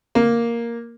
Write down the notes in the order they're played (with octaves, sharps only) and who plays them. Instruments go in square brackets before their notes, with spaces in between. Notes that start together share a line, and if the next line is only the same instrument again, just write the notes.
[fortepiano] A#3